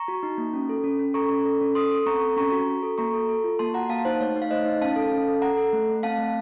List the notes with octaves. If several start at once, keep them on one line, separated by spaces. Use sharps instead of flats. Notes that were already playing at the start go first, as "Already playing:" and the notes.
Already playing: A#5 C#6
F#4
D#4
A#3
C#4
A4
C#4
C#4
A4 A#5 C#6
C#4
A4
C#4
A4 C6 D#6
A4
C4 A#5 C#6
A4
C#4 A#5 C#6
F#4
F#4
A4
A#3 A#5 C#6
A4
A4
F4
A#3 A5 C6
F#4 F#5 A#5
A#3 F5 A5
D#4 C5
A3 C#5
D#4
F5
A3 C5 D#5
D#4
C#4 F5 A5
A4
C#4
A4
A4 F#5 A#5
A4
A3
A3
C4 F5 A5
A3